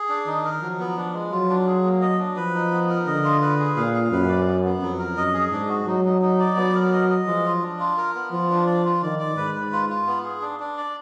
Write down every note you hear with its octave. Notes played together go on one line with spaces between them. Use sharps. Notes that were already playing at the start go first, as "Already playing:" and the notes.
Already playing: G#4
D4
D#3 D#4
A#4
F3 F#3
B3
D4
G#3
F#3 F4
D4
G#4
A#3
D#5
D4
F3 B4
D#4
B3
A#4
D3 D#5
F4
B4
G#4
A#2 F5
F5
F#2 B4
D5
B3
B3
F2 F#3
A#4
F#2 D#5
G#4
G#2 D4
F#4
F#3 D#4
D#4
D#4
D5
F#3 B3
A#4
D#5
D#5
F3 G#3
F4
D4
F4
A#4
B3
F3 F4
D4
D5
F4
D#3 D5
D5
G#2 B4
B4
F4
F4
B3
G#4
D4
D4
D5